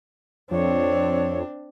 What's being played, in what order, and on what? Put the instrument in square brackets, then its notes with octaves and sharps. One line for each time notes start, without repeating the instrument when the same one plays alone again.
[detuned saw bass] F2 [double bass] C4 D4 [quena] C#5